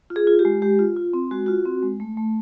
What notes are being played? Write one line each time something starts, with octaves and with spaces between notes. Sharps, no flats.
F4
G#4
F4
G4
G#3
G#3 G4
F4
F4
C4
G#3 F#4
F4 F#4
C4
G#3
A3
A3